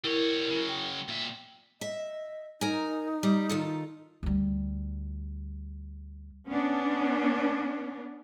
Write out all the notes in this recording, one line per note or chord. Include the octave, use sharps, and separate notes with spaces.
G3 E4 A#4 C#5
C#3 F#3
G5
A#2 E5
D#5 E5
D#4 A#4 G#5
G3
D#3 F4 A4
D2 G3
B3 C#4 D4